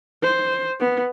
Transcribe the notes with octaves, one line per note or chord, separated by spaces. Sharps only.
C5
B3